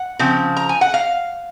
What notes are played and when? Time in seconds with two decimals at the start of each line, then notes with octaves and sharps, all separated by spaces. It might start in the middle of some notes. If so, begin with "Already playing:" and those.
Already playing: F#5
0.19 C#3 F3 C4
0.57 A#5
0.69 G#5
0.81 F#5
0.94 F5